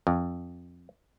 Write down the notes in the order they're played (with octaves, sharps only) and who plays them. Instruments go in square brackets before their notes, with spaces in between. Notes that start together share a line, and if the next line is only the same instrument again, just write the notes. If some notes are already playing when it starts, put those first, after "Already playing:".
[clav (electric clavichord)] F2